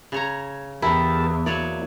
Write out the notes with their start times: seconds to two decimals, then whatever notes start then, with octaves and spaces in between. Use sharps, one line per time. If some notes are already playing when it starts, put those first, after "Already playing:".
0.12 C#3 C#5 A#5
0.82 E2 E4 G4 A#4 A5
1.46 F#3 A#3 E4 C#5 D5